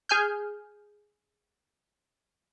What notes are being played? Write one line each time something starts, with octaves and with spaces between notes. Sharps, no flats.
G#4 G#5 F6 G6